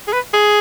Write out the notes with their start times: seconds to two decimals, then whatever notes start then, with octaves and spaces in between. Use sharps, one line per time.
0.08 G#4
0.13 B4
0.34 G#4